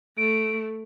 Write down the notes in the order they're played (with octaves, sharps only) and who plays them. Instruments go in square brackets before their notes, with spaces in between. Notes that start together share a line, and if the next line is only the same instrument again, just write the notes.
[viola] A3 [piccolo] D7